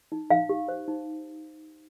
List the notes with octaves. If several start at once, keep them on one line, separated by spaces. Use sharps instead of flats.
D#4
D#4 F5
G4
C5
D#4